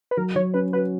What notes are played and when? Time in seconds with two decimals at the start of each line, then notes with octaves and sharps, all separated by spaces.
0.11 B4
0.17 F#3 A#4
0.35 F#3 C#5
0.54 C#4 B4
0.73 F#4 B4